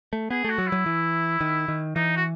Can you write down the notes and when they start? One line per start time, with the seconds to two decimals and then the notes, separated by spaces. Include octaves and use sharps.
0.13 A3
0.30 B3 G#4
0.45 A3 F#4
0.58 F#3
0.67 E4
0.72 F#3
0.86 E3
1.41 D#3
1.68 D#3
1.96 E3 D#4
2.17 F#4